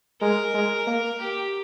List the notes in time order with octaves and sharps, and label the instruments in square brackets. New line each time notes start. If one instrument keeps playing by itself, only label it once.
[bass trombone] G#3 [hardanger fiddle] A#4
[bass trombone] G#3
A#3
[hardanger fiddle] G4